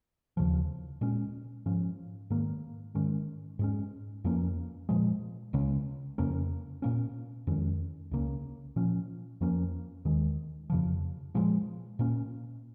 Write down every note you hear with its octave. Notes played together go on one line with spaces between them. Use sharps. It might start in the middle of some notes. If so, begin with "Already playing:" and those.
D#2 C#3 F3
A#2 G#3 C#4
G#2 F3 C#4
G#2 D#3 A#3
G#2 D#3 G#3 C#4
G#2 G#3 C#4
F2 F3 A#3 C#4
A#2 F3 G#3
C#2 C#3 G#3 C#4
F2 C#3 A#3 C#4
A#2 A#3 C#4
F2 D#3 G#3 C#4
C#2 C#3 A#3 C#4
A#2 F3 C#4
F2 F3 A#3 C#4
D#2 D#3 G#3
F2 C#3 F3
A#2 F3 G#3
A#2 A#3 C#4